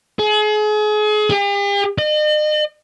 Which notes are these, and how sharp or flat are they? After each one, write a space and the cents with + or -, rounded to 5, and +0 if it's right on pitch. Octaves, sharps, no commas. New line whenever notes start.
G#4 +35
G4 +45
D#5 -40